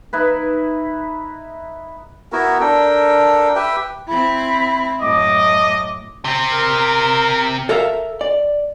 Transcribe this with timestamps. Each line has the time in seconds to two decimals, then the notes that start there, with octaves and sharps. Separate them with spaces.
0.13 D#4 E4 B4
2.32 B3 E4 F#4 A#4
2.61 D4 A4 A#4 G5
3.56 G4 B4 E5 G5
4.08 C4 E4 B5
5.02 F#2 A2 D#5 D6
6.25 C3 C4
6.52 A#4
7.69 A4 A#4 E5 F5 A#5
8.21 D5